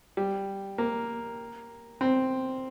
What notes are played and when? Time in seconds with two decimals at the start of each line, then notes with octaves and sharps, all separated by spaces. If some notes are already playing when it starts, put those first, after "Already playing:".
0.17 G3
0.78 A#3
2.01 C4